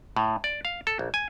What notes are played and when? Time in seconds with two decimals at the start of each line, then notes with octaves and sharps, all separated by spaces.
0.16 A2
0.44 D5
0.65 F5
0.87 A4
0.99 A#1
1.14 G#5